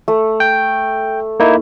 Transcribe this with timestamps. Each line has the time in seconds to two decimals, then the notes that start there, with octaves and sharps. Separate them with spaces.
0.08 A3
0.40 G5
1.40 A#3 D#4 E4